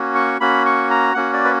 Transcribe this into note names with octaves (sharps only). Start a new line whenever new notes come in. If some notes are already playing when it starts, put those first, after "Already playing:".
Already playing: A#3 C#4 F#4
C#6
A#3 C#4 F#4 B5
C#6
A#5
A#3 C#4 F#4 F#5
D5
B4